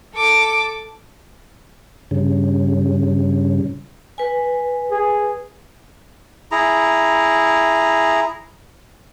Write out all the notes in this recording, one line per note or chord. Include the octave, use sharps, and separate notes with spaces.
A4 D6
G2 C#3
B4 G#5
G#4
E4 G#4 A#5